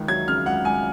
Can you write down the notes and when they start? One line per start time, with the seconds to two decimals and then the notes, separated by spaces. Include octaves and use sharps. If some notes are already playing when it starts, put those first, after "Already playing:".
Already playing: C#2 D#3
0.08 F#3 G#6
0.28 C#3 F6
0.46 C#2 F#5
0.65 C#2 G#5